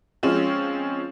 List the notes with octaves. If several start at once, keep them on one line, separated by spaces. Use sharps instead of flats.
F3 G#3 C4 C#4